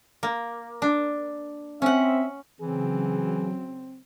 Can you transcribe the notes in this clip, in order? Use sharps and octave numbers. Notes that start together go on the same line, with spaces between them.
A#3
D4
C4 C#4 E5 F#5
C#3 E3 F#3 C4 G#4